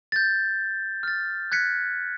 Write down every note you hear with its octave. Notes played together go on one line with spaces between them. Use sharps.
G6 A6
F6 A6
F#6 G#6 B6 C#7